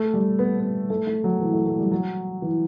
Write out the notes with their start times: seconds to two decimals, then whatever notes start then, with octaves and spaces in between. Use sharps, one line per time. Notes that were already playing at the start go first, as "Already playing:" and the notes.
Already playing: A3
0.14 G3
0.39 B3
0.60 B3
0.90 A3
1.07 A3
1.24 F#3
1.41 E3
1.53 A3
1.66 A3
1.79 G3
1.91 F#3
2.42 E3